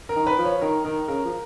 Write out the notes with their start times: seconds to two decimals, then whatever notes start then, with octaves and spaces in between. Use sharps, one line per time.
0.09 A#4
0.16 D#3
0.27 B4
0.38 F3
0.45 C#5
0.61 D#3 A#4
0.85 D#3 A#4
1.08 C#3 A#4
1.25 F3